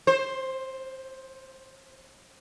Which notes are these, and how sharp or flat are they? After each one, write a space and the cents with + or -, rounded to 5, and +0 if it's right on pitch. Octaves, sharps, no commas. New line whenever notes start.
C5 +10